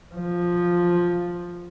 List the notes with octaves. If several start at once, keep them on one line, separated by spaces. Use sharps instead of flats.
F3